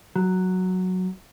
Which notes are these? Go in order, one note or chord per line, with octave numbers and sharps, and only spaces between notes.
F#3